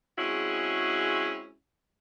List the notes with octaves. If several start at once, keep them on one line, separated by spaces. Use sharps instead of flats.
G#3 C4 C#4 E4 F#4 G#4